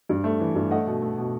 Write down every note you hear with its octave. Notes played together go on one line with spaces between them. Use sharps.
G2
A3
E3
G2
A3 D#5 F#5
B2
A3
B2